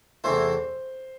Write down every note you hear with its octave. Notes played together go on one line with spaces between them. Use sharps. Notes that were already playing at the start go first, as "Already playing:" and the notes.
E2 C3 E3 A3 E4 C5